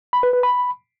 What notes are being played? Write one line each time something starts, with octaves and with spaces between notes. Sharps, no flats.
B5
B4
B4
B5